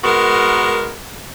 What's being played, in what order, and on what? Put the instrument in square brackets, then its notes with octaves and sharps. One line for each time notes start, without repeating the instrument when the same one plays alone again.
[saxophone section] G#3 B3 F#4 A#4